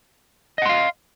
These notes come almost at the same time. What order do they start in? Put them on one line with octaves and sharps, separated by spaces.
D#5 F#5 C6 F5